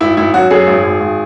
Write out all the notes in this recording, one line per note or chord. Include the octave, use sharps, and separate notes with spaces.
G#1 E4
G#1 E4
F#2 F#4
F#2 G#4
G#1
G#1
G#1